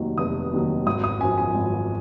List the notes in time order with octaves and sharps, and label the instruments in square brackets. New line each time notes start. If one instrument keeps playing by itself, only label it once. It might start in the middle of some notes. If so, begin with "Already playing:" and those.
Already playing: [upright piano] F1 D#2 D#3 F#3
F1 D#6
D#2 D#3 F#3
G#1 D#6
D#6
F#2 F3 G#5
G#5
G#1